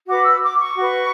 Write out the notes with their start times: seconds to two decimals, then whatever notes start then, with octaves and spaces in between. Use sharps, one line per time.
0.07 F#4 B4 D6
0.24 E6
0.42 D6
0.60 C#6
0.77 F#4 B4